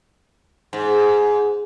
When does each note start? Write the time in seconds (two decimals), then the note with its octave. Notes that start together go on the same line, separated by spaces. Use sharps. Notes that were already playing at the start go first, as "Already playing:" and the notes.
0.73 G#2